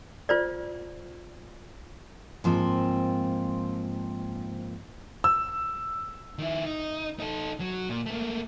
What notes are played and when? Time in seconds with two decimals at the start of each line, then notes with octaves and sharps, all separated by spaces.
0.29 F4 C5 D5
2.44 G#2 F3 A#3 C4
5.24 E6
6.38 D#3 E4
6.66 D#4
7.20 D#4 A4
7.60 F#3
7.90 A#2
8.06 A3 A#3